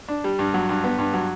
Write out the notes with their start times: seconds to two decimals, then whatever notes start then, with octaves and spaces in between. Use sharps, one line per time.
0.09 D4
0.24 G3
0.39 G2
0.54 F#3
0.69 G2
0.84 B3
0.99 G2
1.13 F#3